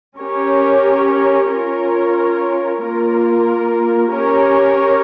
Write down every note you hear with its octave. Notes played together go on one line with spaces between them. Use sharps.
C#4 G4 A#4 C#5
C#4 F4 A#4 C#5
A#3 F4 A#4
C#4 G4 A#4 C#5